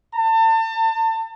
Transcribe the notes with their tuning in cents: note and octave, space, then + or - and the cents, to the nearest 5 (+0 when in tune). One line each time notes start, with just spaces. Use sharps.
A5 +35